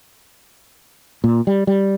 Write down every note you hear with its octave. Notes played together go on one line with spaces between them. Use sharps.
A#2
G3
G3